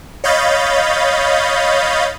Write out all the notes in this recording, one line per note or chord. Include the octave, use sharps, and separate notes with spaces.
C#5 D#5 F5 B5 G6 A6